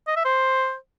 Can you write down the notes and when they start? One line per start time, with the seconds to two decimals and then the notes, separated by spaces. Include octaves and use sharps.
0.07 D#5
0.16 E5
0.25 C5